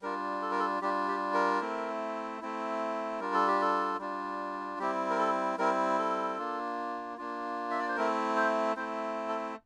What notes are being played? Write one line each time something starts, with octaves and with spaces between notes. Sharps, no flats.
G3 D4 F4 A#4
A4
A#4
A4
G3 D4 F4 G4
G4
A#4
A3 C4 E4
A3 C4 E4
G3 D4 F4 A#4
A4
G4
A4
G3 D4 F4
G3 C4 E4 G4
A#4
A4
G3 C4 E4 A#4
A4
A#3 D4 F4
A#3 D4 F4
E5
D5
C5
A3 C4 E4 A#4
C5
A3 C4 E4 C5
A4